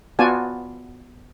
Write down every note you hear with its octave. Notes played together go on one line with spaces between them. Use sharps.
B3 F4 F#4 D5 G#5 A5